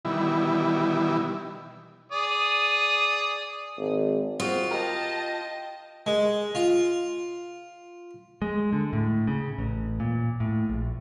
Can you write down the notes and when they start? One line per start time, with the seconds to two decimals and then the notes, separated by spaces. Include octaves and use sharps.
0.05 B2 D#3 E3 G3 E4
2.12 G#4 D5 D#6
3.78 G#1
4.40 C4 F4 F#4 G#4
4.71 G4 A#4 D#5 G5 A5
6.06 G#3
6.55 F4
8.42 G#3
8.73 D3
8.93 A2
9.27 C#3
9.58 A1
10.00 A#2
10.40 A2
10.69 A#1